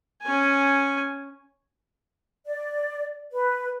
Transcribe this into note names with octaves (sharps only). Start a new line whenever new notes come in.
C#4 G#5
D5
B4